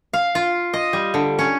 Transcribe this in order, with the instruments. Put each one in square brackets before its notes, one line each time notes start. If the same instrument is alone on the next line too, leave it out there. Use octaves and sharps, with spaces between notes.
[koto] F5
F4
D#5
G3
D3
C#4